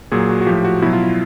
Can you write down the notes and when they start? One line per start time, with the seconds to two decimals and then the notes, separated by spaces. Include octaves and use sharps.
0.12 A#2 F#3 G#4
0.29 F#4
0.41 F#4
0.47 A2 F3 G4
0.65 F#4
0.82 B2 F#3 E4
0.93 F4
1.03 E4